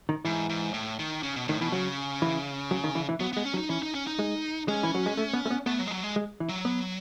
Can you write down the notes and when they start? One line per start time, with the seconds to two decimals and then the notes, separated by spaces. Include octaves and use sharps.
0.09 D#3
0.25 G#2 E3
0.49 G#2
0.74 A2
0.99 D#3
1.23 C#3
1.36 B2
1.48 A2 D#3
1.61 B2 E3
1.72 C#3 F#3
2.22 E3
2.71 F#3
2.84 D#3
2.95 E3
3.09 E3
3.20 F#3 B3
3.33 G#3 B3
3.45 C#4
3.54 F#3
3.58 D#4
3.69 E3 C#4
3.83 D#4
3.95 C#4
4.07 D#4
4.19 G#3
4.68 G#3 C#4
4.83 E3
4.95 F#3
5.06 G#3
5.17 A3
5.33 B3
5.46 A3
5.50 B3
5.66 A3 B3
5.79 F#3
5.86 G#3
5.91 F#3
6.03 G#3
6.16 G#3
6.40 E3
6.49 F#3
6.65 B3